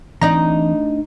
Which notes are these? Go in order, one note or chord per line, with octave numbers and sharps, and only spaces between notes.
D2 E3 C4 D#4 D5 A#5